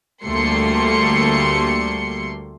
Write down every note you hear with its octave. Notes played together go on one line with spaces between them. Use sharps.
D2 G3 A3 A#3 C6 C#7